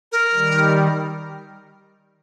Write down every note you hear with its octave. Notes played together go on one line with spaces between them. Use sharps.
A#4
D#3 G3